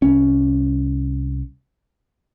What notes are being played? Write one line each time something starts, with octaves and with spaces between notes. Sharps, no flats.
C2 C#4